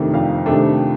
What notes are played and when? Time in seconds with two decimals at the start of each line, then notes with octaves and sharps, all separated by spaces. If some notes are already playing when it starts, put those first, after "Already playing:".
Already playing: F2 C3 D#3 A3 D4
0.14 F2 F5
0.46 C3 D#3 A3 D4